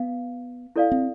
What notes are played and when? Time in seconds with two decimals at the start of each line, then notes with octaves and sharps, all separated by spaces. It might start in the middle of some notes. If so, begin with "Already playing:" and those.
Already playing: B3 F5
0.76 E4 A4 D5 F5
0.92 C4